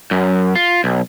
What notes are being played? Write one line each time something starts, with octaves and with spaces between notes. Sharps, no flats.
F#2
F4
B1